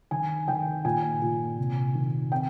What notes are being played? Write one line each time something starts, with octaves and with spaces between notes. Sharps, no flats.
D#3 G#5
D#3 G5
A#2 G#5
A#2
C3
D#3
C4 G5